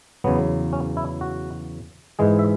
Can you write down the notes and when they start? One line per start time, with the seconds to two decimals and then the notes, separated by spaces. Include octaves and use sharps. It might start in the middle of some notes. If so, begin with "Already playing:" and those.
0.24 E2 C#3 F#3 B3
0.73 C#4
0.97 E4
1.21 F#4
2.19 G#2 E3 G#3 G#4
2.39 E5